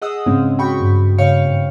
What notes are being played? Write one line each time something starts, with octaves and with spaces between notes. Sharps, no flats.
G#4 D#5 F#5 D#6 E6
G#2 C#3 G#3 C4 C#4
G#3 F#4 G5 B5 C#6
G2
C#3 C#5 F5 G5 F6 C#7
G#2